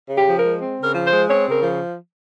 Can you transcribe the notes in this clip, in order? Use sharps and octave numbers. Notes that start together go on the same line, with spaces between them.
C#3
G4
F3
A#4
G#3
C4
C#3
A#4
F3
C5
G#3
C4 C#5
C#3
A#4
F3